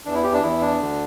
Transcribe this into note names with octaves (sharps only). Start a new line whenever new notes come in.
E2 E3 D4
E4
G4
D4
E2 E3 E4
D4
D2 D3